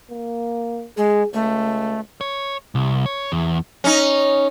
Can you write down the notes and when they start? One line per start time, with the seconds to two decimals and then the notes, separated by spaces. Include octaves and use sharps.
0.11 A#3
0.97 G#3 G#4
1.34 C#2 A3
2.21 C#5
2.75 C2
3.06 C#5
3.32 E2
3.84 C#4 D#4